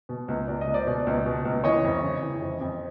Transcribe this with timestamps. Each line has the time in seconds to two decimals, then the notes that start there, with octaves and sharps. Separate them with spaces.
0.09 B2
0.28 C#2
0.48 C#2 D5
0.61 D#5
0.67 C#2
0.74 C5 D5
0.87 B2
1.07 C#2
1.26 B2
1.45 C#2
1.64 E3 C#5 D#5
1.84 F2
2.03 C#3
2.23 E3
2.42 F2
2.61 F2